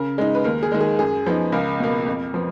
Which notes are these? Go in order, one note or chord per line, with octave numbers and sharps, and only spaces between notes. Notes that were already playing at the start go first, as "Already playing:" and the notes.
Already playing: C#3 A#4
G#3 D#4
B4
D#2 A#4
G#4
D#3 G#3
G#4
F#2 G#4
F3 B3 D#4
C#2 A#4
B2 A#3
F2
F3 B3